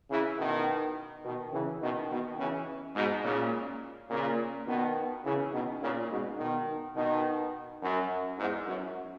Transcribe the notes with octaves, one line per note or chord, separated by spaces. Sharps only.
C#3 E3
B2 D#3
B2 D#3
C#3 E3
B2 D#3
B2 D#3
C#3 E3
G#2 B2
A#2 C#3
A#2 C#3
B2 D#3
C#3 E3
B2 D#3
A#2 C#3
G#2 B2
B2 D#3
B2 D#3
F#2
E2 G#2
F#2